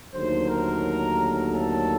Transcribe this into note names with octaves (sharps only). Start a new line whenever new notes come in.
D#2 D3 F#3 A3 C5
A#4
A4